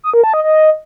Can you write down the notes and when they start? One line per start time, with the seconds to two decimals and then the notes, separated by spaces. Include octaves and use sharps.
0.04 D#6
0.14 A#4
0.24 A5
0.34 D#5
0.44 D#5